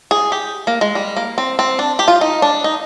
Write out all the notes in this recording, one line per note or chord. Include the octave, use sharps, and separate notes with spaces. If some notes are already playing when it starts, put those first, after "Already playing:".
G#4
G4
A#3
G#3
G3
A#3
C4
C4
D4
G4
F4
D#4
D4
D#4